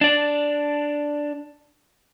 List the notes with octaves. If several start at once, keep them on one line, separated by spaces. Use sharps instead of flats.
D4 D5